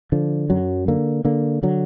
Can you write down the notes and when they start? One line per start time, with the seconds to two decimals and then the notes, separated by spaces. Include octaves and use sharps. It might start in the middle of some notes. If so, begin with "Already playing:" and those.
0.12 D3 F3
0.50 F#2 F#3
0.88 D3 A#3
1.25 D3 A#3
1.63 D3 F#3